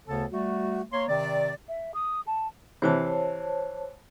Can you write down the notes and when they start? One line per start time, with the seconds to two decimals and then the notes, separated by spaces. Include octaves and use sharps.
0.08 D2 C#3 B3 A4 C#5 A5
0.31 G3 A3 F#4
0.92 A#3 C#5 C6
1.09 C3 D#3 C4 D5
1.69 E5
1.94 D#6
2.27 A5
2.82 C3 E3 C5 C#5 A5